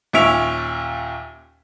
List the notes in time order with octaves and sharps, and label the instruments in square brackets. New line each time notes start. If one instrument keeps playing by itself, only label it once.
[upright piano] D#2 A#2 C#4 E5 D7 F7